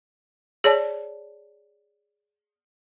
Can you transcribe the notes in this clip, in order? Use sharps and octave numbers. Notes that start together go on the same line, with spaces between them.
G#4 C#5 D5 A5